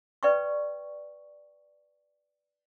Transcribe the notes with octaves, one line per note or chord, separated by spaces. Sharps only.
B4 D5 G5 C#6